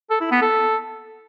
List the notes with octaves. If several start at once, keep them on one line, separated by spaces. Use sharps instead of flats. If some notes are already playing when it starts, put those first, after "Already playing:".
A4
E4
B3
A4